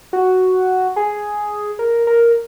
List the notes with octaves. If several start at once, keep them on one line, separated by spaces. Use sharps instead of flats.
F#4
G#4
A#4
A#4